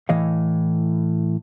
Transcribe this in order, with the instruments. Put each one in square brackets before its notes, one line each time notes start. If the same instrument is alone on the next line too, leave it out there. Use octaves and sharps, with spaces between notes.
[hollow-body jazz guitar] A2 E3 D#5 F5